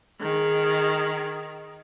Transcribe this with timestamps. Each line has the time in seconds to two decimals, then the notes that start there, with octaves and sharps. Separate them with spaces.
0.21 D#3 G#4